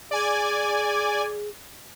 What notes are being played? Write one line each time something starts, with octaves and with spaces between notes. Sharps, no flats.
G#4 D5 G#5